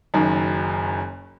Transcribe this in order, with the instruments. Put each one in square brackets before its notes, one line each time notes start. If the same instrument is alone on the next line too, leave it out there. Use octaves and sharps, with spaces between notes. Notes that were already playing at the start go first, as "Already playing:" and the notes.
[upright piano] F#1 F#2 D#3